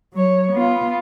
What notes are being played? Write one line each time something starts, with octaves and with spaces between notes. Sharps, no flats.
F#3 C#5
B3 F4